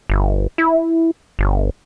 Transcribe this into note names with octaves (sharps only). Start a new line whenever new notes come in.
G1
E4
G1